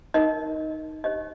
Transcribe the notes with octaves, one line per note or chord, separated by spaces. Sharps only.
D#4 A#4 D#5
D4 G4 C5 D#5